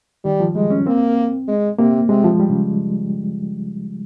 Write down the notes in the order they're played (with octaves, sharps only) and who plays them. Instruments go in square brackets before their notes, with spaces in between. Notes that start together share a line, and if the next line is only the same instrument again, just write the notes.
[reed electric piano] D#3 [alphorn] G3
[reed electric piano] F3
[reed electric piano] G3 [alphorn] G#3
[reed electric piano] C#4
[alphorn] A#3 [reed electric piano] C4
[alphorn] G#3
[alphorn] C3 [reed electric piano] A#3
[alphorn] C3 [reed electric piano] G#3
[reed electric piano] F3
G3
C#3